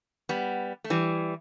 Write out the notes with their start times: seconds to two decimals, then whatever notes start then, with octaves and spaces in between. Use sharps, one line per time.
0.29 G3 B3
0.84 A3
0.90 E3 G3